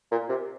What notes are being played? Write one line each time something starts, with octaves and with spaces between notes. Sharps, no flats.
A#2
C3